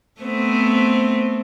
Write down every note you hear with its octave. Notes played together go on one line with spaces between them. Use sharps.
A3 B3 C4